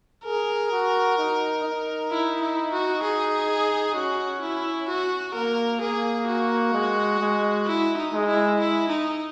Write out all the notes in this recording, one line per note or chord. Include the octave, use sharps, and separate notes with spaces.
G#4 A#4
F#4
D#4
D#4
E4
E4
F#4
G#4
C#4 F#4
E4
F#4
A#3 A#4
A#3 G#4
F#4
G#3
G#3
E4
D#4
G#3
E4
E4
D#4